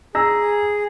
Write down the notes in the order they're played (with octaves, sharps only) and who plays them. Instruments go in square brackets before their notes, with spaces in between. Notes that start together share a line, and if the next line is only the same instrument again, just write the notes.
[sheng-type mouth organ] G#4 [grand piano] A#5 E6 A#6